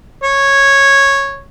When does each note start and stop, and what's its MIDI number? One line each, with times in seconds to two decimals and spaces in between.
0.24 1.45 73